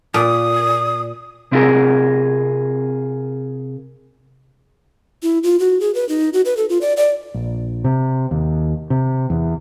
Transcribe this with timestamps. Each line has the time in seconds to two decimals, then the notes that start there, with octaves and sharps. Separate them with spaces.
0.14 A#2 D#6
1.52 C3 C4 E4 F4 G#4 A#4
5.23 E4
5.43 F4
5.60 F#4
5.81 G#4
5.95 B4
6.09 D#4
6.33 F#4
6.45 B4
6.57 A4
6.69 F4
6.81 D5
6.97 D5
7.34 A#1
7.84 C3
8.31 D#2
8.90 C3
9.30 E2